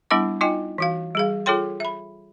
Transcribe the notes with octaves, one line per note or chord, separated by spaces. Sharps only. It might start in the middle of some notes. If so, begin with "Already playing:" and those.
G3 B3 D4 E4 F#5 D6
D#4 F4 D#5 G5 G#5
E3 F#4 F5
G3 G#4 F5
F4 G#4 A4 C#5 G5 C6
E5 B5